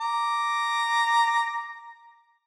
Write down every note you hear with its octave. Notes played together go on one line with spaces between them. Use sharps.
A#5 D6